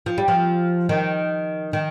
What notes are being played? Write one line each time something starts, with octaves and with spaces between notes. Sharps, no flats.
F3
G3
F3
D#3
D#3